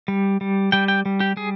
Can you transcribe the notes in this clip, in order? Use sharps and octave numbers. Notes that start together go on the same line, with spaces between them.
G3
G3
G3 G5
G5
G3
G4
G3 G#4